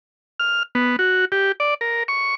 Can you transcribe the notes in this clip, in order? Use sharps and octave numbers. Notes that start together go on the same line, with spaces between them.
F6
B3
F#4
G4
D5
A#4
C#6